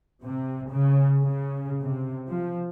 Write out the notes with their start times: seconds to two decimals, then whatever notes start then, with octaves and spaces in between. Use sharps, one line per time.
0.23 C3
0.70 C#3
1.25 C#3
1.83 C3
2.28 F3